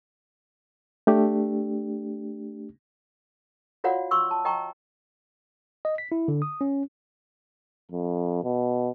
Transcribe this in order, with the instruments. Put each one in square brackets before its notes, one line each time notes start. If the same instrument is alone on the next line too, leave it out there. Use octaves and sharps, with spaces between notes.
[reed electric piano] A3 D4 G4
[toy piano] F4 F#4 C#5 D5 F5 F#5
C6 C#6 E6
A5
D#5 G5 A#5 C#6
[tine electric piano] D#5
B6
E4
D3
D#6
C#4
[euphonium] F2
B2